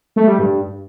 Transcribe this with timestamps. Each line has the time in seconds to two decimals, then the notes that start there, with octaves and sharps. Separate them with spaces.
0.16 A3
0.27 G3
0.39 G2